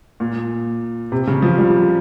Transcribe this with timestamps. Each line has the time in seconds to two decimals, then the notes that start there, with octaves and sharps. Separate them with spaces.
0.20 A#2
1.12 C3
1.27 C#3
1.42 F3
1.58 G3